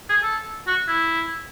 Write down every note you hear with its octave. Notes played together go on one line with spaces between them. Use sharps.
G#4
A4
F#4
E4